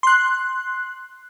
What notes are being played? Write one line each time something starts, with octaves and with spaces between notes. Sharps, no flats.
C6 F#6